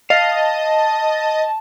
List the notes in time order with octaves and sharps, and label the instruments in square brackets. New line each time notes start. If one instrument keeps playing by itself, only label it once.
[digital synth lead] D#5 [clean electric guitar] F5 [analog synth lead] A5